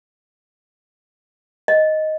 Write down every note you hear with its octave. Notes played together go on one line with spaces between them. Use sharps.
D#5